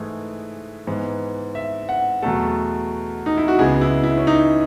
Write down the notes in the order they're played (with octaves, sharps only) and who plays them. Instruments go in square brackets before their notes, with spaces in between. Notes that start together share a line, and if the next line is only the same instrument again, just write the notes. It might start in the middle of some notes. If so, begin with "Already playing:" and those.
Already playing: [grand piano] G#2 E3 A3 G#4
G#2 E3 B3
E5
F#5
E2 B2 F#3 A3 A4
D#4
E4
F#4
C#2 C#3 G#3 B3 G#4
E4
E4
C#4
D#4